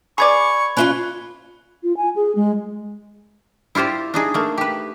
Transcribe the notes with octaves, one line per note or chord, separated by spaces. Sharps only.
G#4 B4 D5 B5 C#6 G#6
C#4 E4 F4 B5 F#6 G7
F4
G#5
G#4
G#3
E4 F4 G4 C5 D5
D4 D#4 G#4
A3 A#3
G4 B4